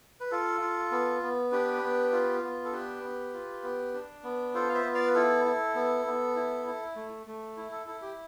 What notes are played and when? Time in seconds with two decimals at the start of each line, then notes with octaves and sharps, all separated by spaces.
0.20 B4
0.31 F4 A4
0.61 F4
0.92 B3
1.22 B3
1.52 D4 G4 B4
1.83 B3
2.12 F4
2.43 B3
2.65 A4
2.72 D4 G4 B4
3.03 B3
3.33 F4
3.63 B3
3.94 D4
4.24 B3
4.54 F4 A4 C5
4.69 F5
4.74 C5 E5
4.85 B3
4.95 D5 F5
5.07 B4
5.15 E4 A4
5.45 E4
5.75 B3
6.06 B3
6.36 E4
6.66 E4
6.96 A3
7.27 A3
7.57 E4
7.72 A4
7.86 E4 A4
8.02 G4